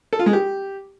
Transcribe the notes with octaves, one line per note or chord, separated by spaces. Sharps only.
A4
F4
G#3
G4